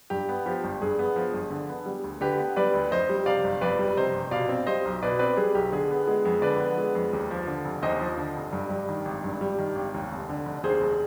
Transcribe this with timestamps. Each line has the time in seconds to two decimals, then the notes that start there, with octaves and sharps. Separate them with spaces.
0.10 G2 G4
0.29 B3
0.46 F3 G4
0.64 G1
0.82 G2 G#4
0.99 B3
1.16 F3
1.33 G1
1.51 D3
1.69 B3
1.86 G3
2.04 D2
2.21 D3 G4 B4
2.39 B3
2.56 G3 B4 D5
2.74 D2
2.91 F2 C5 D#5
3.09 G3
3.26 C3 D5 F5
3.44 G1
3.61 F2 B4 D5
3.79 G3
3.97 C3 C5 D#5
4.14 G1
4.31 B2 D5 F5
4.49 C4
4.66 G3 C5 D#5
4.85 B1
5.02 B2 B4 D5
5.19 C4 B4 D5
5.37 G3 G#4
5.55 B1 G4
5.72 D3 G#4
5.91 B3
6.07 G#3
6.25 F2
6.42 D3 B4 D5
6.60 B3
6.78 G#3
6.95 F2
7.13 D#2
7.31 F3
7.47 D3
7.65 F1
7.82 D#2 C5 D#5
8.01 F3
8.18 D3
8.36 F1
8.53 G2
8.70 G3
8.89 D#3
9.05 G#1
9.24 G2
9.41 G3
9.59 D#3
9.76 G#1
9.94 D#2
10.11 F1
10.29 D3
10.46 F1
10.63 D#2 G#4 C5
10.81 F1